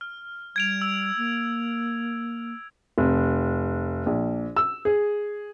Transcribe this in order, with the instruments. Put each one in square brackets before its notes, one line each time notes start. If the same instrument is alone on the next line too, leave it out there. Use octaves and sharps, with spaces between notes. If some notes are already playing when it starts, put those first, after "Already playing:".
[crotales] F6
[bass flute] G3 [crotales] G#6 D7 F7
[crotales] E6
[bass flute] A#3
[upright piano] F1
A#1
E6
G#4